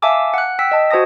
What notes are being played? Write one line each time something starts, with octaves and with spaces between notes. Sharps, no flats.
E5 F5 G#5 A5 D6 E6
F#5 F#6
G5 E6 B6
D#5 A5
F#4 C5 A5 D#6 A#6